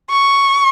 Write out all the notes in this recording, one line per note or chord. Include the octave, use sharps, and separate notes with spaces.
C#6